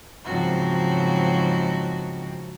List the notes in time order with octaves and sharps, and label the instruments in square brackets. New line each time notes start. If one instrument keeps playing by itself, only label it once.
[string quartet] G#2 C#3 F3 F#3 C4 F#4